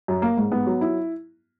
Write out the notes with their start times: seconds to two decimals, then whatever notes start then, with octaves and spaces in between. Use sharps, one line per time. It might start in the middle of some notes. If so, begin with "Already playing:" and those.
0.08 F#2
0.22 A#3
0.38 G#2
0.52 B3
0.66 F#3
0.81 E4